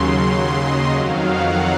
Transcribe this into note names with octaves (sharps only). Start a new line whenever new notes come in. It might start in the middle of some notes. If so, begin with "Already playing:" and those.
Already playing: D#2 C#3 F#3 C6
D#5
F2 D#3 F#3 F5
F#5